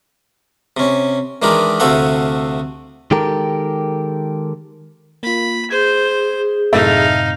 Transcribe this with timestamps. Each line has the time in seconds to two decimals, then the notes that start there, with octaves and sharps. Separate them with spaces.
0.77 C3 C#4
1.42 D#3 E3 G#3 D4 G4 A#4
1.80 D2 C3 A3 A4 F5 F#5
3.11 D#3 G#3 G4 A4 A#4
5.23 A#3 F4 B5
5.70 G#4 C5 G#6
6.73 F#2 A2 C3 A3 D#4 E4 F5